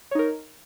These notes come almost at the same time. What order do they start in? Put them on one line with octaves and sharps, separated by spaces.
C#5 D#4 A#4